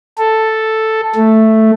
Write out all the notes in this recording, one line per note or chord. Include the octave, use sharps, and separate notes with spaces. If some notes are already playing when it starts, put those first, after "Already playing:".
A4
A3